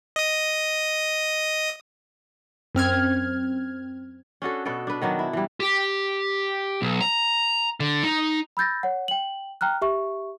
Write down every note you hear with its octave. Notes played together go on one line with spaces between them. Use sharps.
D#5 D#6
F#2 C4 F6 G#6
C#4 D4 F#4 A4
B2 B3 A4 D5
D4 B4
D#3 F#3 B3 D4
E4
E3 G3
G4
B1
A#5
D3
D#4
B5 E6 G6 A6 A#6
C#5 F#5
G5 F#7
G5 A#5 F6 F#6
G4 E5 C#6